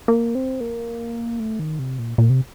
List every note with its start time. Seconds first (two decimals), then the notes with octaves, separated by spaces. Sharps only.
0.08 A#3
0.35 C4
0.61 A#3
1.40 A3
1.59 D#3
1.79 C3
1.99 A#2
2.18 A#2
2.30 C3